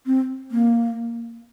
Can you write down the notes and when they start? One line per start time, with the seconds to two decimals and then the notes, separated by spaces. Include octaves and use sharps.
0.06 C4
0.51 A#3